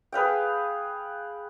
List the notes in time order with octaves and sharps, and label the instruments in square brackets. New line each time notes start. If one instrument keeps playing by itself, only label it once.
[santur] G#4 B4 F5 G5